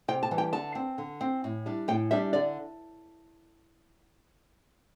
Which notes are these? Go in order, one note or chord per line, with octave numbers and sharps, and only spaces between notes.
C3 G5
A5
E3 G3
G5
D3 A5
C4
D3
C4
A2
G3 D4
A2 G5
G3 D4 E5
D3 D5